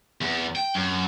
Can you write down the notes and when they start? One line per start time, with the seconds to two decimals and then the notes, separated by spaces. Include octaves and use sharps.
0.21 E2
0.55 G5
0.75 F#2